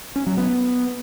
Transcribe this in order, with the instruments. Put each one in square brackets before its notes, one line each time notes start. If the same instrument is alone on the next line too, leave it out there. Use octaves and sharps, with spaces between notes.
[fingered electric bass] C#4
F#3
B3